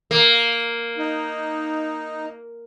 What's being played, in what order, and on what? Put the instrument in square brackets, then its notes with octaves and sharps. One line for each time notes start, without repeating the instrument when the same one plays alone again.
[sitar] A#3
[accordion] D#4